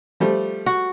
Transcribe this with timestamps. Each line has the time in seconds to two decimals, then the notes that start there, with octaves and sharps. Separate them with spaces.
0.20 F3 G3 A3
0.66 F#4